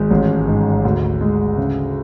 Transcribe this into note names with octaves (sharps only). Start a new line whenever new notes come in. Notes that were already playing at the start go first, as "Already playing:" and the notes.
Already playing: G#1 G#3
A1
G#2
D2
G#3
C#3